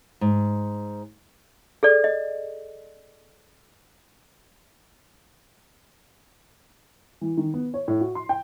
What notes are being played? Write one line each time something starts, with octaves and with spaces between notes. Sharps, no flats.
G#2
G#4 A4 D5
D#5
E3
D#3
B3
C#5
A2
F#4
C6
G5